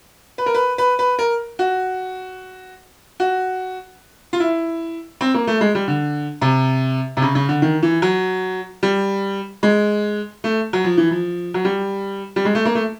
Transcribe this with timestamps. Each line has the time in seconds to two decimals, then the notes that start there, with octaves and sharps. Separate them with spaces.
0.38 B4
0.46 A#4
0.54 B4
0.78 B4
0.99 B4
1.19 A#4
1.59 F#4
3.20 F#4
4.33 F4
4.40 E4
5.21 C4
5.34 A#3
5.47 A3
5.61 G#3
5.75 G3
5.88 D3
6.42 C3
7.17 C3
7.22 C#3
7.35 C#3
7.49 D3
7.62 D#3
7.83 E3
8.02 F#3
8.83 G3
9.63 G#3
10.44 A3
10.73 F#3
10.84 F3
10.97 E3
11.11 F3
11.54 F#3
11.65 G3
12.36 G3
12.45 G#3
12.55 A3
12.65 A#3
12.75 A3